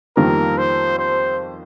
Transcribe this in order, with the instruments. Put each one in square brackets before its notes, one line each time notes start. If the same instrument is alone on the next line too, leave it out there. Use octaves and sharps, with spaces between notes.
[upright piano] F2 D#3 G3 A#3 F4 [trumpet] A#4
[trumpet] C5
C5